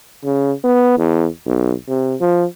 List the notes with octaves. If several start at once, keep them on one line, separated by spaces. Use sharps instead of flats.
C#3
B3
E2
B1
C3
F3